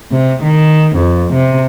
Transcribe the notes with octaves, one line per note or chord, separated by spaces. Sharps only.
C3
D#3
F2
C3